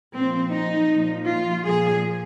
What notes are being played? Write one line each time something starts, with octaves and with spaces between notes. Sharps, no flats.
A#2 F3 C4
D#4
A#2 F3
F4
A#2 F3 G#4